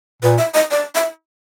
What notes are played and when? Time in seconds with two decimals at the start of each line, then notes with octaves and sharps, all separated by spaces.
0.23 A#2 B4
0.38 E5
0.54 D#5
0.71 D5
0.95 E5